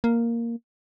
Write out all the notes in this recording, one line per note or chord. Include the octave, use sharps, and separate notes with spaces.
A#3